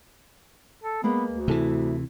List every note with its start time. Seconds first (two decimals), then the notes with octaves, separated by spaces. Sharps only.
0.84 A4
1.03 G#3 A#3 B3 B4
1.30 D2
1.48 C3 E3 E4 A4 G#5